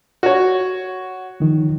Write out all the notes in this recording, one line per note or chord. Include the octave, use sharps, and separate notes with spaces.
F#4 C#5
D#3 F3